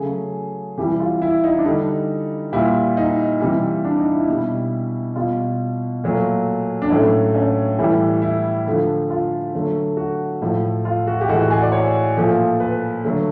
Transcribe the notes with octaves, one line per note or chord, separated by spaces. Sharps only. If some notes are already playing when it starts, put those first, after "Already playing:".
Already playing: C#3 F#3 A3 G#4
C3 E3 G3 G4
F4
E4
D#4
D4
D3 G3 D#4
A#2 G3 E4
D#4
C3 E3 G3
D4
D#4
E4
B2 G3
B2 G3 F4
A#2 F#3 A3
D4
A2 F#3 A3 C#4
C#4
A2 E3 G3
E4
D3 F3 A3
F4
D3 F#3 A3
F#4
A2 F3 A3
F4
F#4
G4
A2 E3 G#3 F#4
F#4
G#4
D5
C#5
A#2 F3 A3
B4
D3 F#3 A3